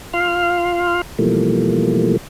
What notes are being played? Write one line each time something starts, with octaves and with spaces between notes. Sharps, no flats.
F4 F5 C6 F6
B2 E3 F3 G3 A3 A#3